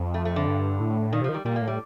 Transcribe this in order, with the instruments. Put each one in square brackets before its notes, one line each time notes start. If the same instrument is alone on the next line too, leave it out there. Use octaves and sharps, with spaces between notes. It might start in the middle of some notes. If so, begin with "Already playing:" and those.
Already playing: [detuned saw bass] F2
[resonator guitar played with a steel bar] A3
A3
D3
[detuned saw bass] G2
A2
[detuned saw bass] A#2 [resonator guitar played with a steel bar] D#3
[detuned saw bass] C3 [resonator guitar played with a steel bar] F3
[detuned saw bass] D#3
[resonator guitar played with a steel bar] G3
[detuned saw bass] A#2 [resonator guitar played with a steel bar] G3
[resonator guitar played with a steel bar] A#3
[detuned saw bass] A2
[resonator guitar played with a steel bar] G3